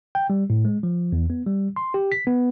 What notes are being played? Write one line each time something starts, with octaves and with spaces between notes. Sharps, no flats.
G5
G3
A2
G#3
F3
E2
B3
G3
C6
G4
B6
B3